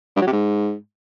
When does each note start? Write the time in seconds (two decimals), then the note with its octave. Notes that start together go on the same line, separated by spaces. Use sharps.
0.16 G2
0.22 F#3
0.27 C3
0.32 G#2